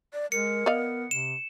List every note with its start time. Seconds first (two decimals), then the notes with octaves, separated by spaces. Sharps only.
0.13 D5
0.32 G#3 A#4 C#7
0.66 B3 D5 D#5 F5
1.11 C3 E7